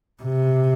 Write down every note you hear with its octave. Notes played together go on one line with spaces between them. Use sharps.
C3